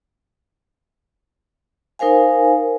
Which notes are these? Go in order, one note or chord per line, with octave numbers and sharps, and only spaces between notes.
D#4 A#4 C5 F5 G#5